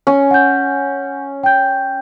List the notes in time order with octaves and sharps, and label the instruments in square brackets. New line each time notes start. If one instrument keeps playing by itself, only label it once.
[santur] C#4
[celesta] F#5 G6
G5 G6